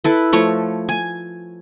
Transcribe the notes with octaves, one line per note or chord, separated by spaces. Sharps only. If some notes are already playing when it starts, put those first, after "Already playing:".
E4 A4 B4
F3 A3 C#5
G#5